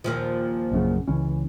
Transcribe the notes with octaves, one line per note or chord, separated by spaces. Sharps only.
D#2 A#2 F3
A#1 F#2 C#3
C#2 E3 C#4